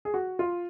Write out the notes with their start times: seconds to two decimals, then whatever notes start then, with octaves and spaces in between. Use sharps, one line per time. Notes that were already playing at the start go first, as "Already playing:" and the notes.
0.05 G#4
0.14 F#4
0.39 F4